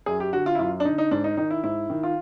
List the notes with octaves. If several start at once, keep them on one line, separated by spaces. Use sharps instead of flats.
F#2 G#4
G4
D3 F#4
F4
E4
F#2 F4
D4
D3 D#4
D#4
G#2 D4
D#4
D#3 D#4
E4
G#2 E4
D#3
F4